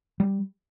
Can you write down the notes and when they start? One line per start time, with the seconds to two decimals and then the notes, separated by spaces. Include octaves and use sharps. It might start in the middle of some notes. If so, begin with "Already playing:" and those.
0.20 G3